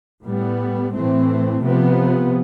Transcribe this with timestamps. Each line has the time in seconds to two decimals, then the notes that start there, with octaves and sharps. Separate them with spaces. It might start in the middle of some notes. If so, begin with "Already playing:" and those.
0.24 A2 G3 B3
0.93 A2 E3 A3 C4
1.62 C3 F3 B3